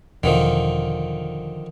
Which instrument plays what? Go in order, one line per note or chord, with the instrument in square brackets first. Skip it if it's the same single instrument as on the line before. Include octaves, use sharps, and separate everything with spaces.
[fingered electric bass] E1 [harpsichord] D3 D#3 F3